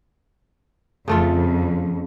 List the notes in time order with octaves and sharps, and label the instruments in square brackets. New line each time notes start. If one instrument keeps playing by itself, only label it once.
[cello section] F2 [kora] C#3 A3 F4